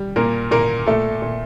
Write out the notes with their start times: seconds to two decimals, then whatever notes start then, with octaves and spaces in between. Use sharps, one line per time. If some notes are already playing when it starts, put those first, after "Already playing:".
Already playing: G3
0.16 A#2 A#3 A#4
0.51 A#2 A#3 A#4
0.87 A#2 A3 A4
1.22 A#2